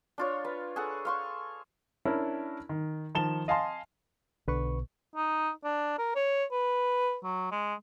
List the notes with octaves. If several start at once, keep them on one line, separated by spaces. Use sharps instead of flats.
D4 F4 C#5
B4
G#4 A4 F#5
F5 C6 C#6
C#4 D4 E4 A#4
D#3
D#3 F3 A5 E7 G7
D#5 F5 G#5 A5 C6
B1 D3 B4 C#6
D#4
D4
A#4
C#5
B4
F#3
G#3